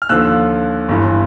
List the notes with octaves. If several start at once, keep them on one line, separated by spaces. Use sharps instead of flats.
F6
D#2 D3 F3 E6 F#6
G1 G2 E3